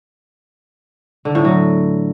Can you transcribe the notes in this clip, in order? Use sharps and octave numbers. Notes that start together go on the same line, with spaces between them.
D3
A2
F#3